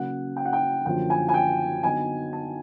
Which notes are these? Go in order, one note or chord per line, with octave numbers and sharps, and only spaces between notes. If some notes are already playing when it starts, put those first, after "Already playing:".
Already playing: C#3 F#3 A#3 C#4 F#5
G5
F#5
G5
F#2 D3 F3 A#3 G5
G#5
G#5
G5
D3 F#3 B3 D#4 G#5
A5